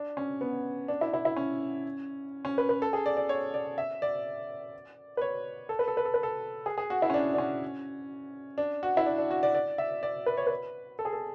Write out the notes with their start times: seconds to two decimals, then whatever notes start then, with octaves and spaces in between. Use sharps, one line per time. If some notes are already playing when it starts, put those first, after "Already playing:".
Already playing: D4
0.17 C#4
0.41 B3
0.88 D4
1.01 E4
1.14 E4
1.25 E4
1.36 C#4
2.45 C#4
2.58 B4
2.69 B4
2.82 A4
2.93 G#4
3.06 D5
3.17 D5
3.29 C#5
3.54 D5
3.78 E5
4.02 D5
5.17 B4
5.21 C#5
5.69 A4
5.79 B4
5.88 A4
5.97 B4
6.05 A4
6.14 B4
6.23 A4
6.66 G#4
6.78 G#4
6.90 F#4
7.02 E4
7.10 C#4
7.14 D4
7.34 D4
7.38 C#4
8.58 D4
8.83 F#4
8.97 E4
9.06 D4
9.18 D4
9.31 F#4
9.43 D5
9.55 D5
9.78 E5
10.03 D5
10.26 B4
10.37 C#5
10.47 B4
10.99 A4
11.05 G#4
11.13 A4